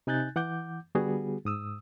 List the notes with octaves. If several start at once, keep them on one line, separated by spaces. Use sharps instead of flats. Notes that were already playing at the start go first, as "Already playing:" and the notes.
C3 D#4 G#5 F#6 G6 A6
E3 F#5 D6 G6
D3 G3 B3 F#4 G#4
G#2 D#6 E6